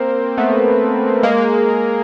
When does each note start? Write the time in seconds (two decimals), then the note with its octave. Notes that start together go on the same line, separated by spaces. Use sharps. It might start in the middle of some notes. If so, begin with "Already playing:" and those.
Already playing: A#3 C4
0.38 A3 B3
1.23 G#3 A#3